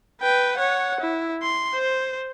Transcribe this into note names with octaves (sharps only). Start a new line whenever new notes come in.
B4 G5
C#5 F#5
E4
C6
C5